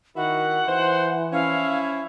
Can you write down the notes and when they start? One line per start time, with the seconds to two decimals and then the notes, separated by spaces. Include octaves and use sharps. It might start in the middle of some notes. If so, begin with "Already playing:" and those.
0.16 D#3 E4 F#4 F#5
0.68 E3 C5
1.33 F3 C#4 E4 F5